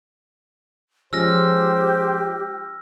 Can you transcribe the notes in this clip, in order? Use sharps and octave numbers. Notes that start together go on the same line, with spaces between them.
F3 G#3 C#4 G4 C5 E6 F6 A#6